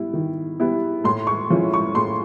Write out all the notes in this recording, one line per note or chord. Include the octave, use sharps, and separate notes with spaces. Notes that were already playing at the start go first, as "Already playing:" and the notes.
Already playing: G3 B3 E4
D#3
G3 B3 E4
A2 C6
C#6
F3 G#3 C#4 E4
C#6
A2 C6